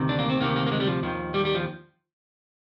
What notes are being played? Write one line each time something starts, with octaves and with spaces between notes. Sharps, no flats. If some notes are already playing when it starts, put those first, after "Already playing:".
Already playing: D2 C3 D#3
D4
A#3
C4
D2 C3 D#3 A#3
A#3
A#3
G#3
G3
F3
D#2 D#3 F3
G3
G3
F3